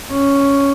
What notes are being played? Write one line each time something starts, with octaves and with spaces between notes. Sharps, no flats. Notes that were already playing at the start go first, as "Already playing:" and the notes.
C#4